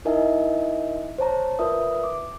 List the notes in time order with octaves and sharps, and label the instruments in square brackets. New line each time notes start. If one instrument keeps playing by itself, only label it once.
[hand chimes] D#4 E4 A#4 D#5 E5 G#5
C5 C#5 A5 A#5
F4 A#4 B4 D5 E5 D#6
D6